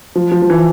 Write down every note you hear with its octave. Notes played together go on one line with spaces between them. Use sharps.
F3
F3
F3
E3